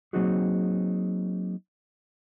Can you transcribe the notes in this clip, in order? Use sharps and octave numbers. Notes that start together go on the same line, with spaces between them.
F#3 A#3 C4 D#4 F#4 G#4